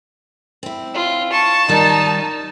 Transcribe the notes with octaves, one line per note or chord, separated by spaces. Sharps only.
C4 E4
F4
A5 C#6
D#3 G3 D#4